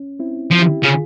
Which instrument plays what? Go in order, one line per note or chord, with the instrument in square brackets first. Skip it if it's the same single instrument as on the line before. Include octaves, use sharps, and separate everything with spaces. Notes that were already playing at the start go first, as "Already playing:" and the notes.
Already playing: [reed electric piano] C#4
C4 E4
[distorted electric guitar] F3
[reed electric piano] E4 G4
[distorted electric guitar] C#3 [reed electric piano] F4 G#4